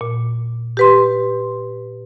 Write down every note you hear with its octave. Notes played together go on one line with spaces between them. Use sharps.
A#2
G4 B4 C6